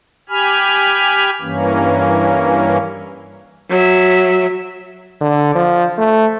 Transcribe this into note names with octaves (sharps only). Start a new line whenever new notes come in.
G4 G#5 B5 F6
G2 E3 A#3 C#4
F#3 E5
D3
F3
A3